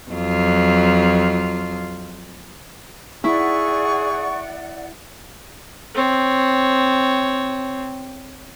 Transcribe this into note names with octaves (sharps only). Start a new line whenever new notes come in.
F2 F#3 F4
E4 G#4 D5 F#5 C#6
C4 C#5